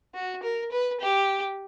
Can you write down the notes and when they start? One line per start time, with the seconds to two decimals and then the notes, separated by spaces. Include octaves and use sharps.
0.15 F#4
0.43 A#4
0.72 B4
1.01 G4